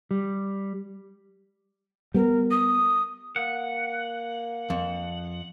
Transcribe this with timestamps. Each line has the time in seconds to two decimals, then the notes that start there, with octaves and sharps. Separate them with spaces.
0.11 G3
2.14 G3 B3 A#4
2.50 D#6
3.36 A#3 F#5
4.70 F2